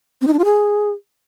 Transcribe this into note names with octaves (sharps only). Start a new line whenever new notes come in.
C4
D#4
D4
F4
G#4